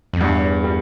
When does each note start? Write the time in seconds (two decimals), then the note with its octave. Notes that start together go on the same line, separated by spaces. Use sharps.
0.13 F2
0.21 E2 G2
0.64 G3